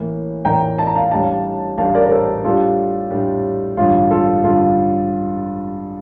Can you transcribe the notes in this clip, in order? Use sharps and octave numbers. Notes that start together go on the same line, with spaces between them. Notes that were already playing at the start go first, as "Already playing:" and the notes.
Already playing: A1 A2 E3 A#3
A1 A2 E3 A#3 G5 A#5
A5
A#5
F5 A5
A1 A2 G3 D4 F5 A5
A1 A2 G3 D4 F5 A5
A#4 D5
A#4
A4 C5
A2 G3 D4 F4 G4 A4
A2 G3 D4 G4
A1 G2 D3 F4
F4 A4
A1 G2 D3 F4 A4